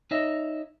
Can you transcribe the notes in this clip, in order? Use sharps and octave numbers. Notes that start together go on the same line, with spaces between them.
D#4 C#5 D#5 E5